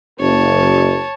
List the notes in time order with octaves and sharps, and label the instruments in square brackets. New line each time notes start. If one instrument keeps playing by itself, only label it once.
[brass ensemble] F#1 [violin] C#5 A5